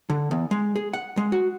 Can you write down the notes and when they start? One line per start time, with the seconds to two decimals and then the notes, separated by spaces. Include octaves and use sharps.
0.10 D3
0.31 E2
0.51 G#3
0.76 G#4
0.93 F#5
1.17 G#3
1.32 F#4